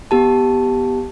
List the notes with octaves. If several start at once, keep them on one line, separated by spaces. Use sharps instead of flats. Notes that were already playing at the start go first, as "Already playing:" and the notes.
B3 G4 A5